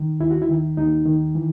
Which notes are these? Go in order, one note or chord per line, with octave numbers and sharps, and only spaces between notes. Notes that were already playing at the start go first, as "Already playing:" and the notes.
Already playing: D#3
D#2 E4
F#4
E4
D#3
D#2 D#4
D#3
E3